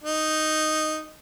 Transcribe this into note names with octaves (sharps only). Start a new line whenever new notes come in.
D#4